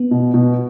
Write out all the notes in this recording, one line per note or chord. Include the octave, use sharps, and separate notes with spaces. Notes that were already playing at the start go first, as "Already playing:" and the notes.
Already playing: B3
B2
B2